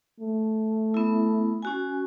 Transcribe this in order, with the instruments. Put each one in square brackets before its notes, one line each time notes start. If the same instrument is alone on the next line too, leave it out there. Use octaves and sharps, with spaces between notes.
[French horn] A3
[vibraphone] B3 E4
C#4 F#4 G#5